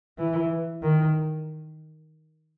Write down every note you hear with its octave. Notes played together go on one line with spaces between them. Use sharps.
E3
D#3